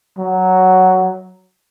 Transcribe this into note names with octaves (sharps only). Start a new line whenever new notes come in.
F#3